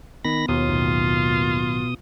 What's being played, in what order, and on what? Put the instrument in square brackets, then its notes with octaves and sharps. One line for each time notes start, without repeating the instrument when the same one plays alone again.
[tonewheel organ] D#3 B5 A#6 [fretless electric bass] B3
[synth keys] D#2 [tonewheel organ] B2 D#6 [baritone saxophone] F4
[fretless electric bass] B1 A2 D#3